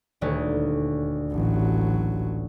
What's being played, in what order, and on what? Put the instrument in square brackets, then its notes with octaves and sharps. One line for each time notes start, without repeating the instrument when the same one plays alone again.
[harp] D#1 D2 C#5
[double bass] A1 F#3